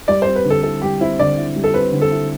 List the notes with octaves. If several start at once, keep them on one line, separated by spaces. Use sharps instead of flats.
G3 D5
C4 C5
B4
D3
A4
E4 A4
G3 G4
C4 E4
D3 D5
E4
G3
A4
C4 B4
D3
A4
E4